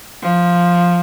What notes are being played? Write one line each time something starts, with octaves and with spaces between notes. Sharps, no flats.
F3